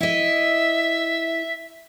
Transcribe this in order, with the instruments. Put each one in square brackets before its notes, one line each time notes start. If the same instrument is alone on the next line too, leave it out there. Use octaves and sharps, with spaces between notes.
[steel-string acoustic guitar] E4 D#5 [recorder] E5